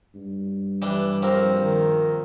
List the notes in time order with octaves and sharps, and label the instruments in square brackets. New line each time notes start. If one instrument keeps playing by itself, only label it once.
[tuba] G2
[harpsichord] E3 G3 D4
A#1 C4 A#4
[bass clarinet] D#3